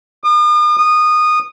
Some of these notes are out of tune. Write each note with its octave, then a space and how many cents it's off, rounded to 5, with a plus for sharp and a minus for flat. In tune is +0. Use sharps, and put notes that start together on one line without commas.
D#6 -45
D#6 -20